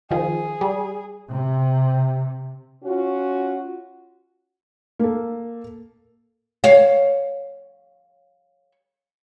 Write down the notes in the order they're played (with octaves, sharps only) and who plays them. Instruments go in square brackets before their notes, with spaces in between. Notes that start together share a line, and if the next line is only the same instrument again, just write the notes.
[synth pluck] D#3 F3 [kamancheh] G#4
[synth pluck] G3
[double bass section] C3
[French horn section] C#4 F4 F#4
[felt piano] A#3 A4
[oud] C#5 F5